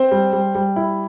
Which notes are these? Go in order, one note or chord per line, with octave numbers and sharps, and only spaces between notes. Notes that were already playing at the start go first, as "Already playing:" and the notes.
Already playing: C4 C5
G3
G3
G3
E4